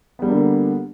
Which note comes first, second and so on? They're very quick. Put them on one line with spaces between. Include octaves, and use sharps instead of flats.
B3 G3 D4 A#3 D3